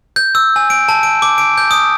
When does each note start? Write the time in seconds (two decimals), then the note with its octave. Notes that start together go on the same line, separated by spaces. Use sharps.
0.16 G6
0.35 E6
0.56 G#5
0.70 D7
0.89 A5
1.03 D7
1.22 D6
1.38 D7
1.58 G6
1.71 D#6